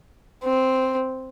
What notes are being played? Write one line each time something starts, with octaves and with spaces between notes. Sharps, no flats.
C4